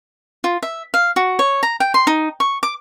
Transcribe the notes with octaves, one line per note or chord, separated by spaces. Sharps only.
F4
E5
F5
F#4
C#5
A#5
G5
C6
D#4
C#6
D6